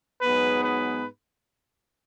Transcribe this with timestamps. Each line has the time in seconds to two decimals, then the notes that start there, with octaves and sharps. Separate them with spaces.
0.21 G#2 F#3 B3 D#4 G#4 B4
0.63 B4